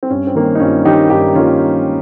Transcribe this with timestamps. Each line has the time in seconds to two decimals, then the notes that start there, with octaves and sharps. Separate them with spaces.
0.03 C4
0.10 G2 C#4
0.27 C4
0.35 D#3 A#3
0.43 C#4
0.55 D#4
0.60 G2 C#4 F4
0.85 D#3 A#3 D#4 G4
1.10 G2 D#4 G4
1.35 D#3 A#3 C#4 F4